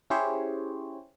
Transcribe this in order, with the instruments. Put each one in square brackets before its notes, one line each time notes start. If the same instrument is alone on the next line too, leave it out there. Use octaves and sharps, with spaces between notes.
[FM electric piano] C#4 E4 G4 G#4 C5 C#5